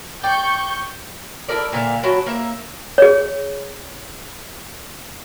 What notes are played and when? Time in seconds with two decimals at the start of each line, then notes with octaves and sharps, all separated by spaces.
0.24 D5 G5 C#6 G6
1.49 E4 A4 A#4 D5
1.73 A#2 D3 E5 F5
2.03 F#3 E4 F#4 A5
2.26 A#3 E5
2.98 G#4 C#5